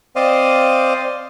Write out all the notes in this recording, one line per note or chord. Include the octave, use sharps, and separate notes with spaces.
C4 C5 D5 D#5 F5